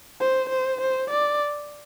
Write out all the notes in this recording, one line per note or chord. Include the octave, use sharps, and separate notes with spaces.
C5
C5
C5
D5